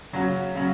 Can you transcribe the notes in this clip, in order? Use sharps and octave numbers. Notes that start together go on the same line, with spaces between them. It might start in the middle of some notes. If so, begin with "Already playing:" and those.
C#3 F#3 C#4 F#4
C#3 F#3 C#4